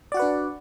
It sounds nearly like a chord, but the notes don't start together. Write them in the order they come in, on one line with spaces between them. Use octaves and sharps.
D5 F#4 F#5 B4 D4